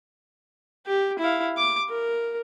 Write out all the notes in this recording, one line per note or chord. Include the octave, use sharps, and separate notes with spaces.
G4
E4 F5
D6
A#4